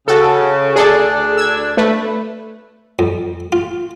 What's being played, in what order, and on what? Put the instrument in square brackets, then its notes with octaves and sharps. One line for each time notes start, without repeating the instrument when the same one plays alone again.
[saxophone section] C#3 [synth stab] F#4 A4
[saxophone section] D2 D4 [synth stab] G#4 A4 D5
[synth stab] E6 G#6
A3 B4
[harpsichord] F2
F4